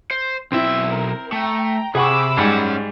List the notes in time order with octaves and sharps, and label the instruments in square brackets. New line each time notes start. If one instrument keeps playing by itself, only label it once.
[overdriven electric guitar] C5
[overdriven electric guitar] B1 E5 [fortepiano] C4 E4
[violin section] A#4
[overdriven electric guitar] A3 [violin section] G5 A#5
[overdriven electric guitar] C3 [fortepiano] G#4 F#5 C#6 [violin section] B5 D6 E6
[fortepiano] G#2 G3 G#3 [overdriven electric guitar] C#4 F#5